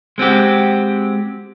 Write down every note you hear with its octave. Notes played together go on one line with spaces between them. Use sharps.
G#3 C4 F#4 G4